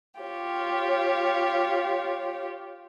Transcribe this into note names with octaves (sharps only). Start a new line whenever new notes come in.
F4 G4 C#5